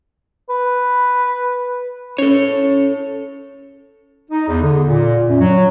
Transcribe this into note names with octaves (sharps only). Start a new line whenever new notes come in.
B4
C#4 A4 C#5
D#4
E2
D3
A#2
F#2
F#3